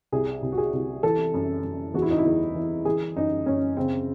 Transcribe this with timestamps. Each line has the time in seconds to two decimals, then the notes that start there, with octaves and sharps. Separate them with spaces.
0.12 C2 G#4
0.42 C2
0.52 F#4
0.58 G#4
0.73 C2
1.03 E3 A4
1.34 F#2
1.64 F#2
1.94 E2 F#4
2.02 E4
2.11 D#4
2.18 E4
2.25 E2
2.55 E3
2.85 E3 G#4
3.16 F#2 D#4
3.46 F#2 C#4
3.77 C#3 C4